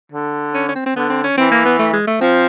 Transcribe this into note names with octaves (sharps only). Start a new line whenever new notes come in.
D3
C#4
C#4
C4
C4
D3 B3
C4
C#4
E3 C4
A#3
B3
A3
G#3
A3
F3 C4